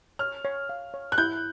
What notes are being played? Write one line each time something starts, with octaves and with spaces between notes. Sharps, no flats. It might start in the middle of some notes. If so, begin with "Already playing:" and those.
C#5 F6
C#5
F5
C#5
F#6
E4 G6